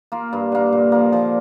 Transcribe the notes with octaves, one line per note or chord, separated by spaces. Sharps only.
A#3 F4
G2
D3 A#3
A#2
F3 A#3
F3